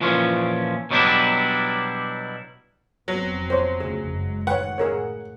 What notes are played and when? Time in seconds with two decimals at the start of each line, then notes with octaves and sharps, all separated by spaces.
0.01 A#2 E3 F3 C#4
0.91 B2 F#3 G3 D4 E4
3.08 F1 F#3 B3 C4
3.50 C5 C#5
3.80 D2 C#3 F3 G#4
4.09 F#1 G#3
4.47 A1 D#3 G#3 B4 C#5 F#5
4.78 A2 G#4 A#4 C#5